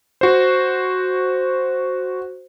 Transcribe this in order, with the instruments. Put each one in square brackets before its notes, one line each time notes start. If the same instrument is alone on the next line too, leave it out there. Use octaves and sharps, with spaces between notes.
[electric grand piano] F#4 C5